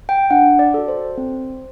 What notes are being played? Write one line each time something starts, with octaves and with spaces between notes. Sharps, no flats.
G5
D4 F#5
D5
F#4 A4
C5
C4